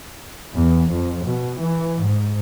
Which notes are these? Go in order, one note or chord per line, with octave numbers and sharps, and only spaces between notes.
E2
F2
B2
E3
G#2